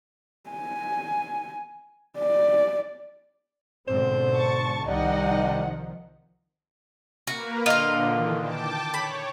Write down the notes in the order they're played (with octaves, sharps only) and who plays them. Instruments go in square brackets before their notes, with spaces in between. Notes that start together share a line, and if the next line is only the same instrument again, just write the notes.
[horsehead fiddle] G#5
D5
[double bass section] G#2 B2 D3 [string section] C4 [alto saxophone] C5
[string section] A5 C#6 A6
[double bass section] C2 D#3 F3 [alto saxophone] G3 [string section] D#4 D#5 F#5
[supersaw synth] A#3 A#4 B4 [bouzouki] F#4
[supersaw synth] A#2 D3 [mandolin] F4 F5 [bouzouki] D#5
[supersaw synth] D#3 E3
G5 A5 D6
[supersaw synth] C#5 [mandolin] B5